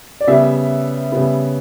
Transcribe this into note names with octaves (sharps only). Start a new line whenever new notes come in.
D5
C#3 G3 B3 E5
C#3 G3 B3